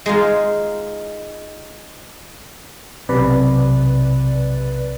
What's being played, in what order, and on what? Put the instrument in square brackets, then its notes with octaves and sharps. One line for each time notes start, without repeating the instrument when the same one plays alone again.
[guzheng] G#3 D#4 F4
[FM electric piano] B1 C3 B4 D5